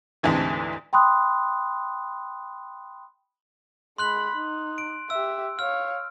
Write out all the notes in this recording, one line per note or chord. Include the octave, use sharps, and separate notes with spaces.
D2 G#2 C3 E3 A3
G5 B5 C6 D#6 F#6
G#3 B5 C6 F#6 F#7
D#4
D7
G4 E5 E6
C#5 F5 F6